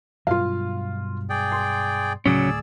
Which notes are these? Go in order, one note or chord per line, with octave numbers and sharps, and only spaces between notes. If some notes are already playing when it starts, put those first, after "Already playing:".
G2 B2 F#3 F4 F5
G#4 D5 G5
C6
D1 A2 C#3 F#3 C#4 G#4 D5 E6